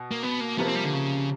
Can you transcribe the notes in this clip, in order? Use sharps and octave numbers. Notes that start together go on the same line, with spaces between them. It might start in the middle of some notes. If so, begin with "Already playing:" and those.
Already playing: B2
A#3
B3
A#3
C3 F3 A#3 B3
C4
G3
D3
C#3